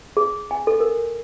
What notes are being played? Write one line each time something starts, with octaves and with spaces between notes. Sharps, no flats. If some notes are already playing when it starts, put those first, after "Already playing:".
G#4
G#5
A4
A#4